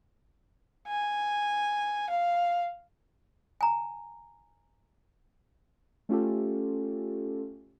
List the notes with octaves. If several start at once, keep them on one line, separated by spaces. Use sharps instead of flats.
G#5
F5
G#5 A#5
A3 C#4 F4 G4 A4